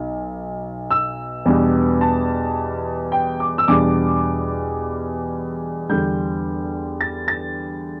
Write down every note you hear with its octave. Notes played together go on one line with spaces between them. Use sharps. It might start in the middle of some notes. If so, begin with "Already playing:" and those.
Already playing: B1 B2
E6
E2 B2 G3 D4
A5
G5
D6
E6
E2 B2 G3 D4 D6
E2 D3 G3 G6
A6
A6